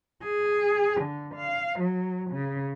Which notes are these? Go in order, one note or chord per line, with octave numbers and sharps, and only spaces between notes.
G#4
D3
F5
F#3
C#3